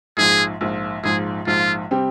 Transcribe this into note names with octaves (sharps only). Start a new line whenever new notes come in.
A#1 G#2 F3 G#4
A#1 G#2 F3
A#1 G#2 F3 G#4
A#1 G#2 F3 F4
C3 G3 C4 G4